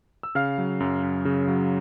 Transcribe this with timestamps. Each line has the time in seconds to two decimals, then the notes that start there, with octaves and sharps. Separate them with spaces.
0.23 E6
0.35 C#3 F5 F6
0.58 F#3
0.80 F#2
1.03 F#2
1.25 C#3
1.48 F#3